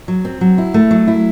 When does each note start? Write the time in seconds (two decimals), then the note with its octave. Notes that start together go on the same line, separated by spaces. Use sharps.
0.08 F#3
0.25 C4
0.41 F#3
0.58 E4
0.74 A3
0.91 F#3
1.07 E4